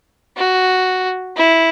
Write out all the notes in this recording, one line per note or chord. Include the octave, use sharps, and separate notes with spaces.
F#4
E4